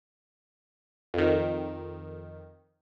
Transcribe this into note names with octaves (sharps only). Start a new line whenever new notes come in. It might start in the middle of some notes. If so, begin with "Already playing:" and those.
F2 D#3